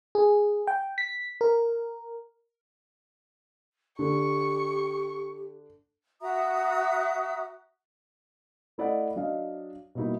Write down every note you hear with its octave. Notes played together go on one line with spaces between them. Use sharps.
G#4
G5
B6
A#4
D3 G4 C#6
F#4 E5 A#5 D#6
A3 E4 D5 D#5 F#5
F#3 D4 D#5 F5
B2 G3 A#3 D#4 E4 F#4